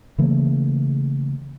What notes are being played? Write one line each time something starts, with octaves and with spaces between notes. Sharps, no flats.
C#3 E3 A3 A#3